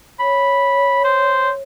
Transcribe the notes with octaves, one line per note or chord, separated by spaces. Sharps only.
C#5 B5
C5